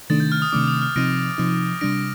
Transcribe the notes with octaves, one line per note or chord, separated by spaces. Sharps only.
C3 D#3 A3 D4 A6
G6
F6
D#6
C3 D#3 A3 D4 D6
D#6
F6
C3 F3 C4 D#4 A#6 D7
C3 F3 C4 D#4
C3 G3 D4 A#6 D7